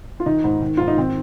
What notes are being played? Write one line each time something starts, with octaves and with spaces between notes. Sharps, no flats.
F4
D#3 D#4
G#2
D#3
G#2 F4
D#4
D#3 C4